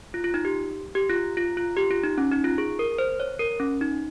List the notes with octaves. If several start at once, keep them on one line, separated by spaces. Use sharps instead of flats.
F4
F4
D#4
G4
G4
F4
F4
F4
G4
F4
D#4
C#4
D#4
F4
G#4
A#4
C5
C#5
A#4
C#4
D#4